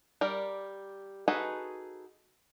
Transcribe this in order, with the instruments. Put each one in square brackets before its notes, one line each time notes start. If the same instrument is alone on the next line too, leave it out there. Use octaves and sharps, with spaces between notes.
[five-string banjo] G3 A#4 D5
D#4 F#4 G#4 A4 B4